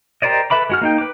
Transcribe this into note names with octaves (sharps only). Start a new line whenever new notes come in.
G4 A#4 C5 D5 D#5
A4 B4 E5 B5 D6
G#3 F#4 F6
A#3 D#4 G5
B4 D6